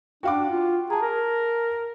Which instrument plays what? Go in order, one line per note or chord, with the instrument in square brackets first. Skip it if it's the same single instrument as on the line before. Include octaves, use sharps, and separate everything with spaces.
[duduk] D4 [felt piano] F#4 F5 D6 [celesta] G5
[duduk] F4
[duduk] G#4 [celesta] A5 A#5
[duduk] A#4